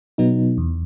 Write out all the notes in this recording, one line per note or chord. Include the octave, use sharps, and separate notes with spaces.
B2 F#3 B3 D#4
E2